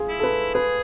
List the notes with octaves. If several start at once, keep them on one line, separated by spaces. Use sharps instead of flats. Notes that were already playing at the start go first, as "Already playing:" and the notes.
Already playing: F4 G#4
E4
A4
B4
G#4 B4